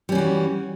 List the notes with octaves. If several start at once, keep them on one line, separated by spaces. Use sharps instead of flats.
E3 G3 C#4 F#4